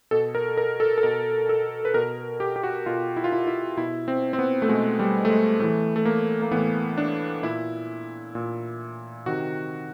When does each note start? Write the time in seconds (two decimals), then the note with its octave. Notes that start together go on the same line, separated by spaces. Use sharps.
0.11 B2 A4
0.35 A#4
0.57 A#4
0.80 A4
0.98 A4
1.03 B2 A#4
1.49 A4
1.85 B4
1.94 B2 A#4
2.40 G4
2.56 G4
2.63 F#4
2.86 B2 F4
3.17 E4
3.24 F4
3.32 E4
3.47 E4
3.77 B2 E4
4.08 C4
4.33 C4
4.39 B3
4.62 A3
4.69 B2 G#3
4.99 G3
5.25 A3
5.30 G#3
5.60 A2 E3 A3
5.96 A3
6.05 A#3
6.42 A#3
6.51 A2 E3 B3
6.98 D4
7.43 A#2 E4
8.35 A#2
9.26 C3 D#3 F#4